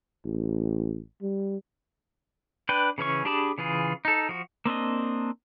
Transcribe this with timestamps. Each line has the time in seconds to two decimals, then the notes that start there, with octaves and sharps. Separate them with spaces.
0.25 A1
1.22 G3
2.69 D4 B4 G5
2.98 C#3 E3 C#4 C#6
3.25 D4 G4 G#4 A5 B5
3.58 C#3 E3 F4 G#4
4.05 D#4 A4
4.29 F3 F#4
4.65 A#3 C4 D4 D#5